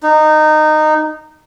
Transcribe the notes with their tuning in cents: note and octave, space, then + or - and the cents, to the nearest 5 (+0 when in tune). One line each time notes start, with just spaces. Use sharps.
D#4 -20